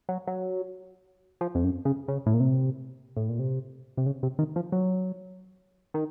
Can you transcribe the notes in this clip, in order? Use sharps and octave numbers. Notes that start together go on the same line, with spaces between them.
F#3
F#3
F3
F2
F#2
C#3
C#3
A2
A#2
C3
A2
A#2
C3
C3
C#3
C3
D#3
F3
F#3
D#3